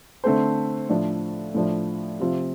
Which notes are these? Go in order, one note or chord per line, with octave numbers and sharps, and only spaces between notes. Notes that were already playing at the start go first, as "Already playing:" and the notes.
D3 A3 C4 A4 C5
A2 F3 D4
A2 F3 D4
C3 F3 C4 F4